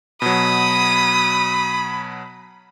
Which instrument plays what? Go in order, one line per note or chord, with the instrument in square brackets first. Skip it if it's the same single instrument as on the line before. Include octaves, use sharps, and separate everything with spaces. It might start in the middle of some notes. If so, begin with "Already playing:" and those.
[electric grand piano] B2 F#3 [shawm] B5 [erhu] D#6